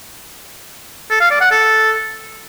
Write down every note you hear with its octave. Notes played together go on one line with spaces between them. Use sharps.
A4
F5
D5
F#5
A4